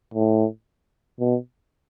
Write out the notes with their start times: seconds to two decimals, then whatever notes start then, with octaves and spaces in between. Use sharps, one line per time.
0.14 A2
1.20 B2